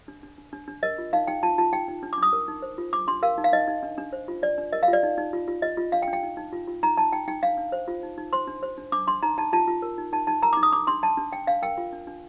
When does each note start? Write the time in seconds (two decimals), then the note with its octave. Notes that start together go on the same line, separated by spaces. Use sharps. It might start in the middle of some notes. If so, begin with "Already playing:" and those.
0.08 D4
0.23 D4
0.38 D4
0.53 D4
0.68 D4
0.83 A#4 D#5
0.98 F4
1.13 D#4 F5
1.27 D#4 G5
1.43 F4 A5
1.58 F4 A5
1.73 D#4 G5
1.88 D#4
2.03 D4
2.13 D6
2.18 D4 D#6
2.33 A#4
2.48 D#4
2.62 C5
2.78 F4
2.93 D4 D6
3.08 D4 C6
3.23 A#4 F5
3.38 D#4
3.44 F5
3.53 D#4 D#5
3.68 D#4
3.83 D4
3.98 D4
4.13 C5
4.28 F4
4.43 D4 D5
4.58 D4
4.73 A#4 D#5
4.83 F5
4.88 F4
4.93 D5
5.03 D#4
5.18 D#4
5.33 F4
5.48 F4
5.62 F4 D#5
5.77 F4
5.92 D4 F5
6.02 G5
6.08 D4
6.13 G5
6.23 D#4
6.37 D#4
6.53 F4
6.67 F4
6.83 D#4 A#5
6.97 D#4 A5
7.12 D#4 G5
7.28 D#4 G5
7.43 D4 F5
7.57 D4
7.72 C5
7.88 F4
8.03 D#4
8.18 D#4
8.33 C5 C6
8.47 D4
8.63 C5
8.78 D4
8.92 D4 D6
9.08 D4 C6
9.23 D#4 A#5
9.38 D#4 A5
9.53 F4 A5
9.67 F4
9.82 A#4
9.98 D#4
10.13 D#4 A5
10.27 D#4 A5
10.43 A#4 A#5
10.53 D6
10.57 D#4
10.63 D#6
10.72 D4 D6
10.87 D4 C6
11.02 D4 A5
11.17 D4
11.33 D4 G5
11.47 D4 F5
11.62 A#4 G5
11.78 F4
11.93 D4
12.07 D4